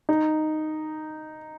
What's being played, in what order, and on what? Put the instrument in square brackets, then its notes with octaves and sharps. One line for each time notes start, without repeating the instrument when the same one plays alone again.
[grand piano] D#4